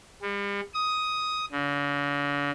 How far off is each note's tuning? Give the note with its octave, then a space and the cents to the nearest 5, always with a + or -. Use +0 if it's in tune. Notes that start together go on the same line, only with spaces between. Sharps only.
G3 +45
D#6 +10
D3 -45